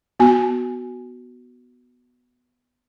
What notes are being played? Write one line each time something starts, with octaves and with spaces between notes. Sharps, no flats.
B3 F#4 G#5